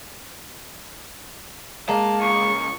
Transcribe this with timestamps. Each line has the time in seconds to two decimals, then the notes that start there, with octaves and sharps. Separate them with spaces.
1.89 G#3 A#3 A5
2.21 C#2 C#6